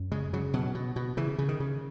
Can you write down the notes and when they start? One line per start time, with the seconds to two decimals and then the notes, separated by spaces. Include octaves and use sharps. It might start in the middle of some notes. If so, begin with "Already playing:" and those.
Already playing: F#2
0.12 C#3 G#3
0.33 C#3 F#3
0.54 B2 F#3
0.75 B2
0.96 B2
1.17 C#3 E3
1.38 C#3
1.49 D#3
1.60 C#3